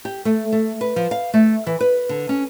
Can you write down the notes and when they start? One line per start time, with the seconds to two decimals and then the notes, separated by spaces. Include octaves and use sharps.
0.05 G4
0.25 A3
0.52 A3
0.81 B4
0.96 F3
1.11 F5
1.34 A3
1.67 E3
1.81 B4
2.09 D3
2.29 C#4